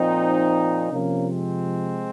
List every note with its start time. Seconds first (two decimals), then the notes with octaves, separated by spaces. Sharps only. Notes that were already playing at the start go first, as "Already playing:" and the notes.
Already playing: A#2 F3 C4 D#4
0.91 C3 F3 A#3 C#4
1.24 G#3 C4